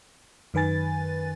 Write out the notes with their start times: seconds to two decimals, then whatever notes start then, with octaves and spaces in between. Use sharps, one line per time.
0.54 F#2 D#3 B4 G#5 A6